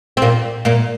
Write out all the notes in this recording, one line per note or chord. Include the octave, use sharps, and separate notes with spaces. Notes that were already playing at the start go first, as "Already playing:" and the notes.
C4
A#2 A#3
A#2 A#3